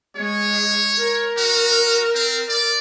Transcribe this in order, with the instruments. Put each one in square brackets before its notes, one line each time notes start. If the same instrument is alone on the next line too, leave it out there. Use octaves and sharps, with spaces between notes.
[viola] G#3 [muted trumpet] C#5
[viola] A#4
[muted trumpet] F#4
C4
D5